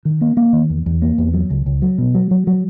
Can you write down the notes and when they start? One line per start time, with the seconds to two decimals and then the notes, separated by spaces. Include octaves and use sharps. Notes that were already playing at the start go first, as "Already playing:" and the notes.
0.05 D#3
0.21 A#3
0.37 A#3
0.53 D#3
0.70 E2
0.86 E2
1.02 A#3
1.18 E2
1.33 F#3
1.50 C#2
1.66 C#2
1.82 F#3
1.98 B2
2.14 F#3
2.31 F#3
2.47 F#3